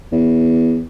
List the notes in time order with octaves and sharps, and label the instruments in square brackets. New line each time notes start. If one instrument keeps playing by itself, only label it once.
[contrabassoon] E2